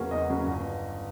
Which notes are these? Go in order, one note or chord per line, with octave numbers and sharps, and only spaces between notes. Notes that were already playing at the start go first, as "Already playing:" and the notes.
Already playing: E2 C#3 F#3 A#3 C#4
E2 D#5
C#3 F#3 A#3 C#4
G1